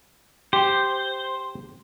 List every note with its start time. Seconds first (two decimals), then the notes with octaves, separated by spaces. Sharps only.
0.53 G4 C5